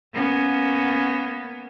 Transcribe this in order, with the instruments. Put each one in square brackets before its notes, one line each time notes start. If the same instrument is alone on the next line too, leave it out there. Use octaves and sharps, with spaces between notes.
[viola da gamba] A#3 B3 C#4